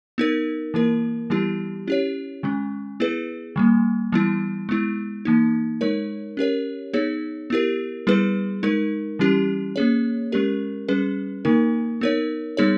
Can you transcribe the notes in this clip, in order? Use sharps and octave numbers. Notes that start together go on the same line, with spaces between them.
B3 D#4 A#4
E3 A#3 E4 A#4
E3 G3 B3 E4 G4
C#4 E4 G4 C#5
D#3 G#3 C#4
B3 E4 G#4 B4
D#3 G3 A#3
E3 G3 B3 E4
G#3 B3 E4
E3 A#3 D#4
G#3 D#4 A#4 C#5
C#4 G4 A#4 C#5
B3 D#4 G#4 C#5
B3 E4 G4 A#4
G3 B3 E4 G#4 B4
G#3 D#4 A#4
E3 G3 C#4 E4 G4
A#3 C#4 G#4 C#5
G#3 C#4 G4 A#4
G3 C#4 G#4 B4
D#3 A#3 D#4 A#4
B3 D#4 A#4 C#5
G3 B3 D#4 G#4 C#5